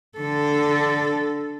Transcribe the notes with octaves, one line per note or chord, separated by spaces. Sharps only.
D3 A4